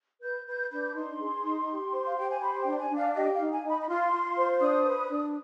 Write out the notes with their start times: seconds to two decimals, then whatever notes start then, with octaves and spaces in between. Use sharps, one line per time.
0.22 B4 G6
0.46 B4 G6
0.71 D4 G6
0.86 D6
0.95 D#4 C6
1.20 G#4
1.44 D#4
1.69 G4
1.92 C5
2.05 F5
2.17 G4 G5
2.30 G#5
2.41 C5 B5
2.59 G5
2.66 D4
2.78 G#5
2.90 D4
2.96 F5
3.14 G4 D#5
3.33 F5
3.39 D#4
3.51 G#5
3.63 D#4
3.69 B5
3.81 B5
3.88 F4 C6
4.12 F4
4.37 C5
4.60 D4 D#6
4.85 B4
5.09 D4